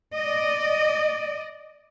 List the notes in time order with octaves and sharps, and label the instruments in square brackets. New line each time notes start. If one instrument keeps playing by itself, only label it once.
[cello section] D5 D#5